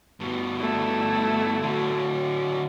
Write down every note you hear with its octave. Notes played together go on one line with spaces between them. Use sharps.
G2 B2
A3 E4
D3 F#3